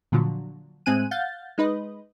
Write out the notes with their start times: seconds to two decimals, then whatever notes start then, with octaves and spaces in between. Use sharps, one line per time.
0.12 A#2 D3 F3 F#3
0.86 A2 G#3 C4 G#5 F#6 D#7
1.11 F5 F#5 G6 A6
1.58 G#3 D#4 B4 D#5